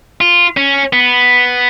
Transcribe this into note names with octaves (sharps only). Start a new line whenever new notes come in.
F4
C#4
B3